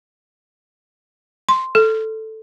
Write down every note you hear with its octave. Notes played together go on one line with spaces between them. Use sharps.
C6
A4